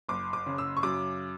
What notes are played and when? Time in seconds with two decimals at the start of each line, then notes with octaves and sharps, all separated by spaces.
0.09 F#1 D6
0.33 D6
0.46 C#3
0.58 E6
0.77 C#6
0.83 F#2 D6